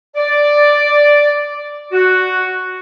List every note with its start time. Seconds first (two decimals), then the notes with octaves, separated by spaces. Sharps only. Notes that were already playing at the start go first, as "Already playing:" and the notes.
0.16 D5
1.92 F#4